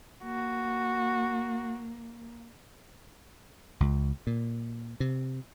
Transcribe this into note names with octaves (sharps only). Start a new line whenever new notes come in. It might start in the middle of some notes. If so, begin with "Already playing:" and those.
A#3 F#4
C#2
A#2
C3